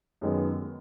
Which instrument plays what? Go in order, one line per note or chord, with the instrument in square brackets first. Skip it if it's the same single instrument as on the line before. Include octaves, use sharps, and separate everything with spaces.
[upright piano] F#2 D#3 G#3 B3